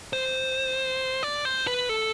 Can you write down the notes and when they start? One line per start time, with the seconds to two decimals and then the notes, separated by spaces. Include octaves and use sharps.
0.13 C5
1.23 D5
1.45 C5
1.67 B4
1.89 A4